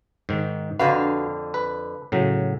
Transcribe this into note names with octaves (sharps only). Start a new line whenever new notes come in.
G#2 D#3
F2 D3 F#4 B4 F5
B4
A2 C#3 F#3